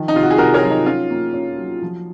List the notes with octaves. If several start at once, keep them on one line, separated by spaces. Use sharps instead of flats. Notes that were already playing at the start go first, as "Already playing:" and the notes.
Already playing: D#3 F3
D#4
C3 F4
F#4
G#4
C3 F#4 A#4
A#4 C#5
F#3 F4
D#4
C#4 F4
A#3
C#4
F#3
F3